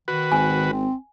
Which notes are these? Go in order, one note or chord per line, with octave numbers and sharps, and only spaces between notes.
D#3 F#4 B4
G#1 G#5
C4